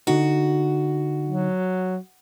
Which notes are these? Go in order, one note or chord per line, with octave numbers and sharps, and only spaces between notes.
D3 D#4 F#4
F#3